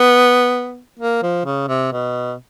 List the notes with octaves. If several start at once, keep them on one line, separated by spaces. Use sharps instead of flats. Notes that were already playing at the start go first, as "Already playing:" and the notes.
Already playing: B3
A#3
F3
C#3
C3
B2